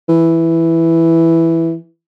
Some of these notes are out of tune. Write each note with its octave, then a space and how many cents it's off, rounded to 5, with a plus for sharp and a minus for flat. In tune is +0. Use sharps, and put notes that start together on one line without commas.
E3 +0